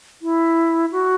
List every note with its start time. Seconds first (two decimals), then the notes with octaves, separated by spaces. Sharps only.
0.22 E4
0.92 F#4